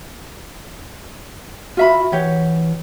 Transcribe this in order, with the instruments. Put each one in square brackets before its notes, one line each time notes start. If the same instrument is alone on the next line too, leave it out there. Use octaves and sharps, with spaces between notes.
[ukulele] F4 E5 B5 [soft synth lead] F#4
[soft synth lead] E3 [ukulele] F#4 G4 C#5